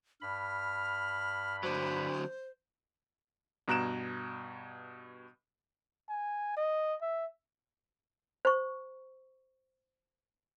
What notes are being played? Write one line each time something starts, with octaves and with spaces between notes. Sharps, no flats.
G2 B5 F6
D3 F#3 C5
G2 B2 A#5 F#6 D7 E7
G#5
D#5
E5
C5 C#6